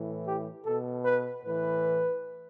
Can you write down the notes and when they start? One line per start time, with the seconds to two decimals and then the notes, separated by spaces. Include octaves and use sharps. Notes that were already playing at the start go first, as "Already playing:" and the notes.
Already playing: A2 E3
0.27 G4
0.65 B2 A4
1.05 B4
1.44 A2 E3 B4